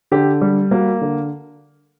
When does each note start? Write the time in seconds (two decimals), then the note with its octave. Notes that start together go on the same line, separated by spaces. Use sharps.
0.12 D3 G4
0.41 G3
0.71 A#3 F#4
1.01 D3